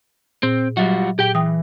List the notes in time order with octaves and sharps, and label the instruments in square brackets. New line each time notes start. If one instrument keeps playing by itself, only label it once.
[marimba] A#2 [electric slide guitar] C4
[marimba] F#3 [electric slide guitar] G3 F4 F#4
[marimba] A#2 [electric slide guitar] G4 G5
[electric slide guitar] E3 [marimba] G5 D#6